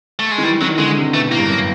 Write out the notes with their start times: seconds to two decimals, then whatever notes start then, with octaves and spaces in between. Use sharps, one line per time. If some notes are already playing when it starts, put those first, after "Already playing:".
0.19 A3
0.31 G#3
0.38 D#3
0.42 E3 G3
0.61 D#3 F#3
0.78 D3 G#3
0.96 C3
1.13 B2 A3
1.26 A2
1.32 A#3
1.38 G2
1.49 F#2